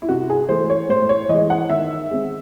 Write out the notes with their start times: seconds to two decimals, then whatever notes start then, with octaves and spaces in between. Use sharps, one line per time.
0.02 E4
0.09 C3 F#4
0.30 G#4
0.49 E3 A3 C5
0.70 C#5
0.89 A2 C5
1.09 C#5
1.29 E3 G#3 D#5
1.50 F#5
1.70 D#3 E5
2.10 G#3 C4